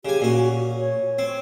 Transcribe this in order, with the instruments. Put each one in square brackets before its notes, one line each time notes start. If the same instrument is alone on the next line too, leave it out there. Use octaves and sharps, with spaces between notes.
[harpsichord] C#3 G#5 [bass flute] G4
[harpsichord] A#2 C#4 [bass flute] F#4
[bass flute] C#5
[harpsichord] C4